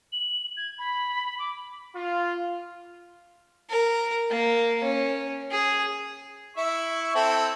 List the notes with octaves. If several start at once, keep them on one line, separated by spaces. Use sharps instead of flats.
F#7
G#6
B5
D6
F4
A#4
A#3
C#4
G#4
E4 E5 C#6
C4 E4 A4